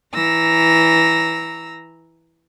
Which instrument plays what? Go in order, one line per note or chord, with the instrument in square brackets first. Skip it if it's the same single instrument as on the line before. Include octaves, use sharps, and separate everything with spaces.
[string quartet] E3 A#5 E6 A#6